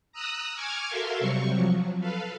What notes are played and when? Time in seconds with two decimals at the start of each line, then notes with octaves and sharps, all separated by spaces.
0.12 A#5 D#6 E6 F#6
0.55 G#5 C#6 D6 F6 G#6
0.89 F#4 A4 A#4 E5 F5 C6
1.20 C3 F#3 G3 C4 C#6
1.53 F3 F#3
2.00 A4 B4 F5